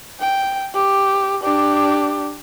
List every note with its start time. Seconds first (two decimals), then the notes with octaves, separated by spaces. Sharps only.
0.20 G5
0.75 G4
1.43 D4 G4